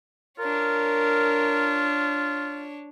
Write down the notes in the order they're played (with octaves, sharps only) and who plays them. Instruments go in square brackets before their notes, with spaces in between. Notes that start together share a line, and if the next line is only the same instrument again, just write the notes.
[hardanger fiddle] D4 C#5 [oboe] F4 [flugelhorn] A#4